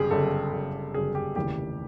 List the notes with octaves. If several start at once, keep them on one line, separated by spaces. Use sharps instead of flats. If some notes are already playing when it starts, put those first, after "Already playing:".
Already playing: G1 F#2 C#3 G4 G#4
G1 F#2 C#3 A4
G1 F#2 C#3
G1 F#2 C#3 G#4
G4
F1 D#2 C#3 E3 G4